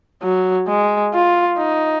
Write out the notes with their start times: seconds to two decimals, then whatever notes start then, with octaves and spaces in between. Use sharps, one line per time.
0.23 F#3
0.68 G#3
1.14 F4
1.58 D#4